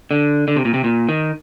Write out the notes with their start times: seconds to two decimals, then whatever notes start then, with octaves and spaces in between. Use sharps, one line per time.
0.11 D3
0.48 D3
0.56 C3
0.65 A#2
0.74 C3
0.84 A#2
1.09 D#3